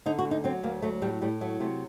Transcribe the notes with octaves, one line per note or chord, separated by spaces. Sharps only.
D3 D#4
F#4
D2
D#4
F#3 C4
D2 A#3
F#3 A3
A2 G3
A2 G3
F#3 A3
C3 A3